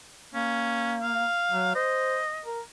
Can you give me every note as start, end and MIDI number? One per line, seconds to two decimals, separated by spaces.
0.34 1.25 58
0.34 0.96 61
1.01 1.73 77
1.51 1.72 54
1.75 2.19 72
1.75 2.44 75
2.45 2.61 70